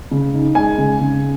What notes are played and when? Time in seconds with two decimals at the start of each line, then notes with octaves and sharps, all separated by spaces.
0.11 C#3
0.34 D#4
0.55 G#3 G#5
0.78 C#3
1.00 C#3